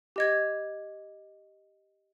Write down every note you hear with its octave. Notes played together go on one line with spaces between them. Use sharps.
G4 D#5 G#6